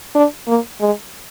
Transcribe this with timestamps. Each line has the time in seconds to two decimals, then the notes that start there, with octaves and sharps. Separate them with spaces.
0.15 D4
0.48 A#3
0.81 G#3